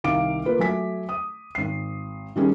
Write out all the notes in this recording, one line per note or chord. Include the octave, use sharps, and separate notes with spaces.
C2 D#3 F5 D6 D7
A#3 F4 B4
F#3 A3 G#5 B6
D#6
G#1 C7
D#3 G3 C#4 G#4